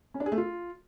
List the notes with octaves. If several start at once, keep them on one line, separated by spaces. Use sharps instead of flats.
C#4
D4
G#4
A3
F4